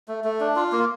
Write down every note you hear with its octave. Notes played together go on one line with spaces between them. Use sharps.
A3
A3
D4
F4
A#3